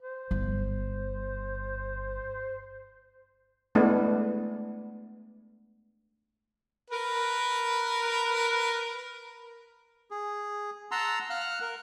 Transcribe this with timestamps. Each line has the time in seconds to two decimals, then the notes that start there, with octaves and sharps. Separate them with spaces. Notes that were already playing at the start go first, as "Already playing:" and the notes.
0.02 C5
0.31 G1
3.75 G#3 A3 B3 D4 E4
6.90 A#4 B4
10.11 G#4
10.91 F#5 A5 A#5 C6 E6
11.30 F5 F#5 F6 F#6
11.61 A#4